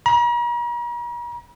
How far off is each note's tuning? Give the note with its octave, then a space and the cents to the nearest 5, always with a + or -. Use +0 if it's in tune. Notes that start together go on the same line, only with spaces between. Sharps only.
A#5 +45